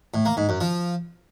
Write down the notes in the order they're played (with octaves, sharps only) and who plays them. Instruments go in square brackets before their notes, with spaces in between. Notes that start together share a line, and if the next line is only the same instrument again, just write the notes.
[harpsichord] A2
A#3
G#2
F#2
F3